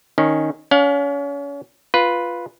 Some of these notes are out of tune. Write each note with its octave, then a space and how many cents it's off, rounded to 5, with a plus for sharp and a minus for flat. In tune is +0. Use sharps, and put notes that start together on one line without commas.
D#3 +0 C#4 +0
C#4 +35 F5 +40
F4 +0 B4 -5